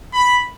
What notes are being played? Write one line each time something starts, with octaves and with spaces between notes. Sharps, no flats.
B5